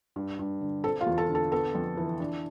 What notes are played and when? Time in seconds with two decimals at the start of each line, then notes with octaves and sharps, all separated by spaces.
0.16 G2
0.39 G2
0.61 D3
0.84 C4 A4 A5
1.01 F4 F5
1.06 E2
1.18 A4 A5
1.29 D3
1.35 A4 A5
1.52 B3 A4 A5
1.75 F2
1.97 E3
2.20 D4